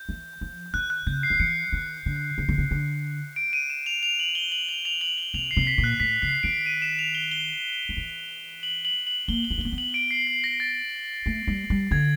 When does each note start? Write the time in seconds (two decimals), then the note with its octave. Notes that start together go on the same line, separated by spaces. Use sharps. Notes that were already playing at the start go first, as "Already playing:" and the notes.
Already playing: G6
0.09 E3
0.41 F3
0.74 D#3 F#6
0.90 F#6
1.07 C#3 G6
1.23 C7
1.30 D#3
1.40 E3 C#7
1.72 D#3
2.06 D3
2.38 C#3
2.49 D3
2.58 C#3
2.71 D3
3.36 D7
3.53 D#7
3.70 E7
3.86 F7
4.03 F7
4.20 F#7
4.35 G7
4.52 F#7
4.69 F7
4.85 F7
5.01 F#7
5.18 G7
5.34 C3 F7
5.51 C7
5.57 C3
5.67 B6
5.78 A#2
5.84 F#6
6.00 A2 B6
6.22 C#3 C7
6.43 D#3 D7
6.66 D#7
6.82 E7
6.99 F7
7.15 G7
7.31 G7
7.89 F3
7.97 E3
8.63 F#7
8.85 F#7
9.07 F#7
9.28 A#3 G7
9.44 F#7
9.51 B3
9.58 A#3
9.61 B3 G7
9.72 B3
9.78 F#7
9.94 D7
10.11 C7
10.27 C7
10.44 A#6
10.60 A6
11.26 A3
11.47 G3
11.70 G3
11.91 D3 G#6